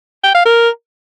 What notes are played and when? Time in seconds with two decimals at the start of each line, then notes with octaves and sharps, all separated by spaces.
0.24 G5
0.35 F5
0.45 A#4